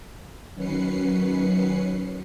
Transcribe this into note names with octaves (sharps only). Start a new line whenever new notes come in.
D#3 F#3 C#4 B4 C7 C#7